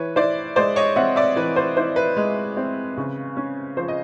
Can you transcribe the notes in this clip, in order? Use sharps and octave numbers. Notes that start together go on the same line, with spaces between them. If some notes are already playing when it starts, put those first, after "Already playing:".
Already playing: E3 B4 C#5
E4 C5 D5
G#3 C5 D5
C#5 D#5
C4 E5 F#5
D5 E5
E3 B4
C5
E4 C5
B4
G#3
C4
C#3
C#4
F3 C5
D#5